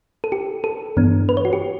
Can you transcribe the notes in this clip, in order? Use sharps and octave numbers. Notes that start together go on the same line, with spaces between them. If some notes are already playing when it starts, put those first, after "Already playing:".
A4
G4
A4
G2 E3 B3 D4
B4
C#5
F#4
G4